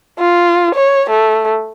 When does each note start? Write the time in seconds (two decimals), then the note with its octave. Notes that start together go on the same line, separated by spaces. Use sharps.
0.19 F4
0.75 C#5
1.10 A3